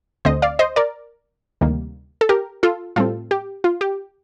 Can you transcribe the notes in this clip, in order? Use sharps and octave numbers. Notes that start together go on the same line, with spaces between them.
D2 D3 A3 C4 C5 D#5
D5 F5
C5 D#5
A#4 D5
D2 C3 D#3 G3 A#3
A4
G4 A#4
F4 A4
A2 G3 C4 F4 A4
G4
F4
G4